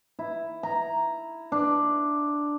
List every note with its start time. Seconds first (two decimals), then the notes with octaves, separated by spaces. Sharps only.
0.19 E4
0.63 A#5
1.52 D4